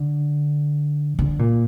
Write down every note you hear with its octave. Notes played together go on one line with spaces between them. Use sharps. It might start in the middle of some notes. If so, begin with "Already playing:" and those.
Already playing: D3
D3
A#2